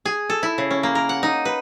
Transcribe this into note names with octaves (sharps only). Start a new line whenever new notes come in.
G#4
A4
E4
C#3
C#4
A#3
A#4
F#5
D#4
B4